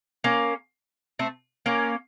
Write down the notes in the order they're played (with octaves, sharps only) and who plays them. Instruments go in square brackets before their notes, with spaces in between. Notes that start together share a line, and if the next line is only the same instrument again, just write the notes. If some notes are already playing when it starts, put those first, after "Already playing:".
[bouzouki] A#3 C#4
A3 C4
A#3 C#4